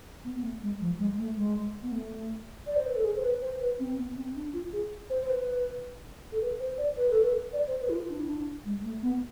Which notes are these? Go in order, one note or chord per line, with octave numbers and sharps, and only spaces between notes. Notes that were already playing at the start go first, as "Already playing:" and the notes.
B3
B3
A3
G#3
F3
G#3
A3
G#3
B3
A3
D5
C5
B4
A4
G#4
C5
B4
C5
B4
C4
B3
C4
D4
F4
G#4
C5
C5
B4
A4
B4
C5
D5
B4
A4
B4
D5
C5
B4
E4
F4
D4
E4
D4
G#3
A3
B3